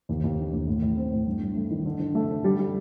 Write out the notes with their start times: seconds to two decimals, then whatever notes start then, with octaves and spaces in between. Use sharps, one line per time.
0.09 D#2
0.24 D#2
0.38 D3
0.53 D#2
0.67 A2
0.82 A2
0.97 C4
1.12 A2
1.27 G2
1.42 G2
1.56 A3
1.70 D#3
1.85 D3
1.99 D3
2.15 A3
2.30 D3
2.44 G3
2.59 G3